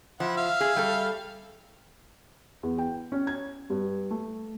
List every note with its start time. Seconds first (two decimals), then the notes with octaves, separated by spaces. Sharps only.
0.20 F3 E4 F#5
0.37 E5 F5 F6
0.61 G#4
0.76 G3 A4
2.63 E2
2.78 G5
3.12 C#4
3.27 G#6
3.70 G2
4.11 A3